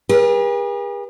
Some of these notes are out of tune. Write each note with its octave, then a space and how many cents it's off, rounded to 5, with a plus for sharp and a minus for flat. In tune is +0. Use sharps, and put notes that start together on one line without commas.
G#4 -45 B4 -45